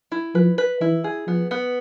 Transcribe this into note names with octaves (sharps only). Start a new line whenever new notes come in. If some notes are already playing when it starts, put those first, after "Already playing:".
E4
F3 B4
B4
E3 E4
G#4
F3 B3
B3